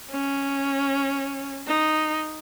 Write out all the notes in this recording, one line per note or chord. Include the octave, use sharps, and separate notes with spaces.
C#4
D#4